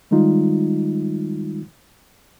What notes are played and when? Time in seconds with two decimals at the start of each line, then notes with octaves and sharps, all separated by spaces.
0.11 D#3 G3 G#3 D#4 F4